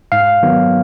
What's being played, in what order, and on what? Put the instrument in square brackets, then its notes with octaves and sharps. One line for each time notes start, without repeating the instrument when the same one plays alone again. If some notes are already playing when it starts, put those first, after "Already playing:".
[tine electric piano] G#2 F5
D#3 F#3 B3